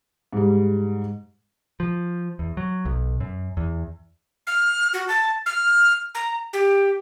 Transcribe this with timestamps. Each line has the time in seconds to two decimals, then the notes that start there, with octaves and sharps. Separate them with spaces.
0.33 G#2 G3
1.80 F3
2.39 E2
2.57 F#3
2.85 B1
3.20 F#2
3.57 E2
4.47 F6
4.94 F#4
5.08 A5
5.46 F6
6.15 A#5
6.53 G4